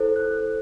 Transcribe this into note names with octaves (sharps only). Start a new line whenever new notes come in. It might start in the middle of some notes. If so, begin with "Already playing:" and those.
Already playing: E4 A4 C5
F#6